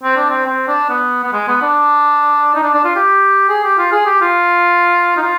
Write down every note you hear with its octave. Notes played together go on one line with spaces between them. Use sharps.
C4
D4
C4
C4
D4
B3
B3
G#3
B3
D4
D#4
D4
D4
F4
G4
G#4
G4
F4
G#4
G4
F4
D#4
F4